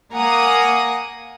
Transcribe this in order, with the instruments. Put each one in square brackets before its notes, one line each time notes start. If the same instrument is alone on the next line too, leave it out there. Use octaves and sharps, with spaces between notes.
[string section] A#3 F#5 G#5 A#5 D#6